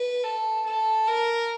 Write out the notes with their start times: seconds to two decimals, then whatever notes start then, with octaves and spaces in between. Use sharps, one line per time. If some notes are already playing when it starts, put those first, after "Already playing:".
Already playing: B4
0.23 A4
0.66 A4
1.07 A#4